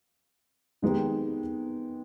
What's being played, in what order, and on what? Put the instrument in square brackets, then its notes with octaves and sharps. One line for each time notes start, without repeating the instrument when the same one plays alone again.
[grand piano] D#3 G#3 B3 D#4 G4